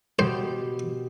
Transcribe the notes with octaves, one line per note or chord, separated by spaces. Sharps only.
B2 G4 C5